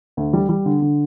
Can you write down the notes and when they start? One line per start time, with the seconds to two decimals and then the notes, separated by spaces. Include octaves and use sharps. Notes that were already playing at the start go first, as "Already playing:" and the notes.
0.17 D2
0.33 G3
0.49 G3
0.66 D3
0.82 D3